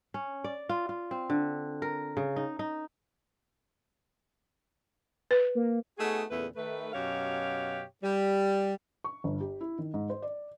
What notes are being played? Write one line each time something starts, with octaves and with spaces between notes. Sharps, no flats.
C#4
D5
F4
F4
C4
D3
A#4
C#3
D#4
D#4
B4
A#3
A3 B3 D#4 F#4 G#4
E2 A#2 C#3 A3 B3 B4
D#3 A3 B4
F#2 B2 F#4 G4 C#5 F5
G3
C#6
G1
G4
E4
D#3
G#2
C5
D5